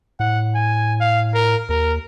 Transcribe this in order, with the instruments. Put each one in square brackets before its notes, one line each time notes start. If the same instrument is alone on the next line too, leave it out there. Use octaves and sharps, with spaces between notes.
[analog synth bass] A2 [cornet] F#5
[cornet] G#5
F5
A#4
[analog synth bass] D#2 [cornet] A#4